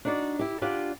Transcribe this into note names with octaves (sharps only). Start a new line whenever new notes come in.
D4 D#4 F#4 C5 D5
E4 G4
D4 F4 G4 D5 F#5